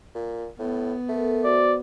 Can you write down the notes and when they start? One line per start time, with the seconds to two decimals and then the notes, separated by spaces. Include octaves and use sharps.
0.15 A#2
0.59 A2 B3
1.09 A3 A4 A#4
1.44 F#4 C5 D5